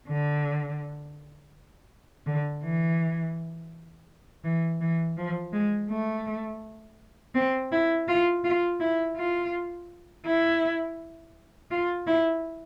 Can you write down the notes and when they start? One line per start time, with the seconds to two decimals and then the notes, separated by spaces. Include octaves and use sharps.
0.09 D3
2.27 D3
2.63 E3
4.44 E3
4.81 E3
5.17 F3
5.53 G#3
5.90 A3
7.35 C4
7.72 E4
8.08 F4
8.44 F4
8.80 E4
9.17 F4
10.26 E4
11.71 F4
12.07 E4